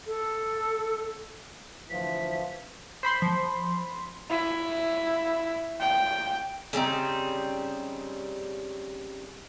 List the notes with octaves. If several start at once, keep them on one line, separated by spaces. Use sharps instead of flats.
A4
D2 E3 F3 B6
C5 B5 C6
F3
E4
G5
C#3 G3 C4 D#4